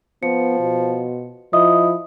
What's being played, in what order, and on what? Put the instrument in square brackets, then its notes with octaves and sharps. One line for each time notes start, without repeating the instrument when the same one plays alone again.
[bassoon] F3 [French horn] B3 [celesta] C#7
[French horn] B2
[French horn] F3 [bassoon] E4 [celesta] D#5 D#6